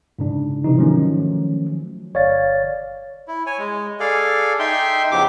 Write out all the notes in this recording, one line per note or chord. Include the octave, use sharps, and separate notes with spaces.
G#2 C#3 D4
C3 E3 D#4
D#3 F3 F#3 A3 C#4
G1 C#5 D5 F5 A6
E4
C#5 G#5
G#3
G#4 A4 D5 F5
D#4 E5 G5 C6
E2 C#3 F3 G4 D6